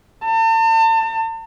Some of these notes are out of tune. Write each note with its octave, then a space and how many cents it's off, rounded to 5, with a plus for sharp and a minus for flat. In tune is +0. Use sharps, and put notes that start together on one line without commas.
A5 +40